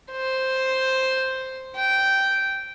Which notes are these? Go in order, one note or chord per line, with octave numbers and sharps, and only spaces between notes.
C5
G5